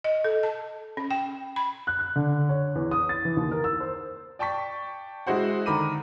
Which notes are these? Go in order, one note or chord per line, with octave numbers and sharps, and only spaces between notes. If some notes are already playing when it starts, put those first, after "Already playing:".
D#5
A4
A5
C#4
G5
B5
F#6
F#6
D3
C#5
E2
D#6
A6
E3
D#2
A#4
E6
C5
D5 G5 A5 C#6 B6
G#3 E4 F#4 C5 F#5
D3 D#3 A#5 B5 D6 D#7